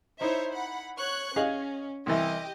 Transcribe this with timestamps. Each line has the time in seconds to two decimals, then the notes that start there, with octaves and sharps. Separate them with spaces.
0.21 D#4 E4 C5 C#5 E5
0.52 F#5 B5
0.97 C#5 C#6 F#6
1.36 C#4 G#4 D#5 F5
2.06 C2 E3 G4 D#5